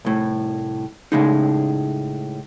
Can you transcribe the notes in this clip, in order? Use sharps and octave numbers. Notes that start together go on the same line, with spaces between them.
C2 A2
A2 C#3 G#3 D#4